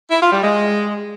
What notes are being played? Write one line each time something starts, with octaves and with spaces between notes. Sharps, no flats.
E4
F4
G3
G#3